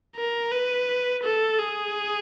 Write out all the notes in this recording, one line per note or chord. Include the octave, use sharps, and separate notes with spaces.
A#4
B4
A4
G#4